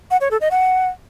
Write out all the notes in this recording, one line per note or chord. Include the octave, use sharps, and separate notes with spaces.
F#5
C#5
A4
D#5
F#5